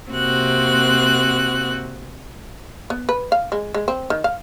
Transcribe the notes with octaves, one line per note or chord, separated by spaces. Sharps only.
C3 A#3 C4 F#4 F#6
B3
B4
F5
G#3
G#3
C4
D#3
F5